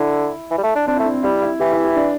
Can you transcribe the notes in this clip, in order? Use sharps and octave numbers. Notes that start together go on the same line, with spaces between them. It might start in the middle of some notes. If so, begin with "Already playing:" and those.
Already playing: D3 E4
E3
G3
A3
D4
C4 D4
A3 E4
D4
C4
G3 E4
E4
E3 G4
E4
G4
D4